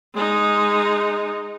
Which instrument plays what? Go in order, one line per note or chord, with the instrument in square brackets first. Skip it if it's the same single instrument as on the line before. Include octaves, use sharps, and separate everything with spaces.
[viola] G#3 D#4